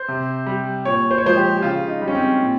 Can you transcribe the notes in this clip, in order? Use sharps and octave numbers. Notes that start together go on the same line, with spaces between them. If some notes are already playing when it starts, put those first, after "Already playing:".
Already playing: C5
C3
G3
A#2 C#5
C5
C#5
F3 G#3 C5
G4
G4
C#3 F4
D#4
G3
C#4
C4
A#2